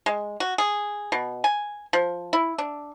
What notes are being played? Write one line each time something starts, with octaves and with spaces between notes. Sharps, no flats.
G#3
F#4
G#4
B2
G#5
F3
E4
D4